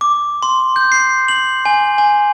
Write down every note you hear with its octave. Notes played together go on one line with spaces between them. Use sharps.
D6
C6
G6
C7
F#7
G#5
G#5